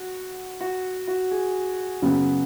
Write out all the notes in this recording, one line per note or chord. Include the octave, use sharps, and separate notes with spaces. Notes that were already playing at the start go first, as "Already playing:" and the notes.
Already playing: F#4
F#4
F#4
G#4
F#2 C#3 F#3 B3